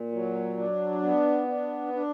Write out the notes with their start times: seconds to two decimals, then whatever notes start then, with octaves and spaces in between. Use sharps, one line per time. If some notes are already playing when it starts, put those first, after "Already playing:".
Already playing: A#2
0.12 F#3
0.57 D4
1.02 B3
1.48 D4
1.93 D4